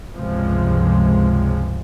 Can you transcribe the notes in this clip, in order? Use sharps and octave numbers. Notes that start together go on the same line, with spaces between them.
C#2 G2 C3 F3 G#3